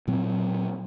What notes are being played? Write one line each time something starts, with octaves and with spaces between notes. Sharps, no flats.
A#2 F#3 C4